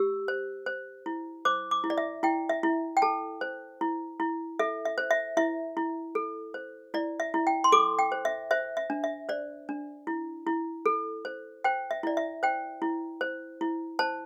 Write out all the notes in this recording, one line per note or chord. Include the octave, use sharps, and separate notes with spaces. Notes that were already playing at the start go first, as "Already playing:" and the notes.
Already playing: G4 E6
C5
C5
E4
C5 D6
D6
E4
D5
E5
E4 G5
E5
E4
G5
A4 A5
C5
E4
E4
A4 E5
E5
C5
E5
E4 E5
E4
A4
C5
E4 D5
E5
E4
G5
C6
A4 D6
G5
C5
E5
C5 E5
E5
D4
E5
C5 D5
D4
E4
E4
A4
C5
C5 G5
E5
E4 D5
E5
C5 G5
E4
C5
E4
C5 A5